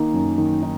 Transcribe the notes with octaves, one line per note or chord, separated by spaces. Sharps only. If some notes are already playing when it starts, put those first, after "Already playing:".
Already playing: D#3 A#3 D#4
F#2
D#3
D#4